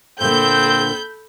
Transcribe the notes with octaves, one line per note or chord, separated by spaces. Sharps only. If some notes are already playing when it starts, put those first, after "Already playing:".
A#2 D3 A#3 C4 A4 B5 G6